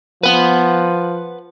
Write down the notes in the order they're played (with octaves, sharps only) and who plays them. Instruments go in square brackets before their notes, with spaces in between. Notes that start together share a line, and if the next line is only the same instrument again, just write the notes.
[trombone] F3 [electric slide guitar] B4 F#5